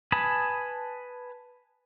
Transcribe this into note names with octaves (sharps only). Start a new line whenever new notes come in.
B4 G#5 A5 B5 D#6